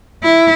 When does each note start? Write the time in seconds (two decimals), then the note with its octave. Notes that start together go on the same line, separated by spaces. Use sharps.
0.24 E4